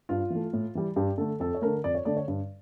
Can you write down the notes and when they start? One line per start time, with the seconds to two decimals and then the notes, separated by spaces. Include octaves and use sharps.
0.09 G2 F4
0.30 E3 A3
0.53 A2
0.75 E3 G3
0.96 G2 G4
1.18 D3 A3 A4
1.40 F2 A4
1.55 C#5
1.62 D3 A3 A#4
1.84 F2 D5
1.95 C#5
2.05 D3 A3 D5
2.17 C#5
2.28 G2